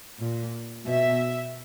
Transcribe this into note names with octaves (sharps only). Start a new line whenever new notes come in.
A#2
B2 E5